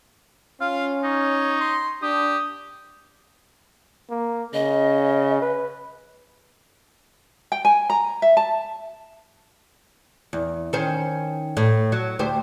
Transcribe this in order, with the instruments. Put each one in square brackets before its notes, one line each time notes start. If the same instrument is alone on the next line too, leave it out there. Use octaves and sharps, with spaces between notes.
[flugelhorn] C#4 [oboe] F4 [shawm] F5
[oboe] D#4 [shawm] C#5
[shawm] C6
[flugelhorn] D4 [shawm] G4 [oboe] D#6
[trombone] A#3
[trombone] C#3 [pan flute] D#5
[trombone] B4
[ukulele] G5
G#5
A#5
E5
A5
[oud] E2
D#3 C#4 C5
A2
F#3
D2 G4 C5